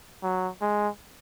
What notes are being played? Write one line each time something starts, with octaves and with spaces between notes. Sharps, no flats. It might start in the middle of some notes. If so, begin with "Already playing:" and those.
F#3
G#3